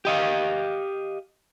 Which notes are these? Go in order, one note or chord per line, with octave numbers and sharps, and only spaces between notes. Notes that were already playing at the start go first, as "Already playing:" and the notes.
G4 D#5 F5